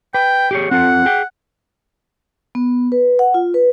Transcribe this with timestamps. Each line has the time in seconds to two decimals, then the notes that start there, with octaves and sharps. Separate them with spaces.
0.14 B4 G5
0.51 G4 G#4 C#5
0.71 C4 F4 A4 F#5
1.06 G#4 G5
2.55 B3
2.92 B4
3.19 F#5
3.34 F4
3.54 B4